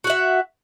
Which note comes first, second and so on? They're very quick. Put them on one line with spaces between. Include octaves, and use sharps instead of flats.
F#4 F#5 E5